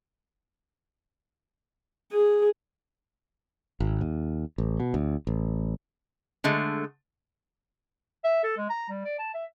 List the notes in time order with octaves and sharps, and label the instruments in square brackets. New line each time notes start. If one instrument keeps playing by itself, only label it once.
[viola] G#4
[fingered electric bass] G#1
D#2
A1
B2
D2
A1
[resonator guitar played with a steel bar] D3 G#3 A3
[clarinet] E5
A4
G#3
A#5
G3
D5
A5
E5